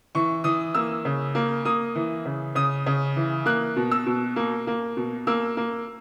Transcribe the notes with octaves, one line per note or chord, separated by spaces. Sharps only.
E3 C#6
E3 D#6
A#3 E6
C#3
A#3
A#3 D#6
E3
C#3
C#3 D#6
C#3
E3
A#3 F#6
B2
E6
B2
A#3
A#3
B2
A#3 E6
A#3